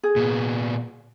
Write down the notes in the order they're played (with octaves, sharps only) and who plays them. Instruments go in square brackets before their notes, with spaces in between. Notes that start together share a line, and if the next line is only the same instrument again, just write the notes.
[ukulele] G#4
[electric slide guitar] A#2 B3